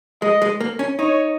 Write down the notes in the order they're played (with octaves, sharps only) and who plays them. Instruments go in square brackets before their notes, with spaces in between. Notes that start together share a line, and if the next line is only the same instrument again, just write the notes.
[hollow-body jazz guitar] G#3 [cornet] D#5
[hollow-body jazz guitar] G#3
A#3
C#4
[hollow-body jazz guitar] D#4 [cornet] C#5